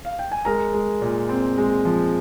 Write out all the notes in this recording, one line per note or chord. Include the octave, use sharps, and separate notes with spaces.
F5
G5
G#5
G#3 A#4 A#5
G#3
A#2
C4
G#3
F3